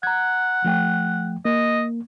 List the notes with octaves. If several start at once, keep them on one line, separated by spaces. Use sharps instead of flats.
F#5 A#5 G#6
F3 A3 G5
A#3 D#5